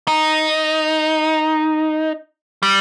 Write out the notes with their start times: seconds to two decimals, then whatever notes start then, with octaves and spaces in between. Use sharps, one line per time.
0.08 D#4
2.63 G3